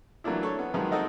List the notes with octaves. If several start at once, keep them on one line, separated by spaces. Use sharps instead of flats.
E3 F#3 A3 A#3 D4 E4
A4 C#5
B3
D#3 F3 F#3 G#3 B3
C4 D#4 F#4 A4 A#4 D#5